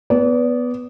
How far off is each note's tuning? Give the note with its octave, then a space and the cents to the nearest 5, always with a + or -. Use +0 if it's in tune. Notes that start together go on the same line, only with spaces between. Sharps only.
B3 +0 D5 -30